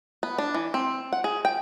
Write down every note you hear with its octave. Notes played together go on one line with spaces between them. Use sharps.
B3
D4
E3
C4
F#5
G#4
G5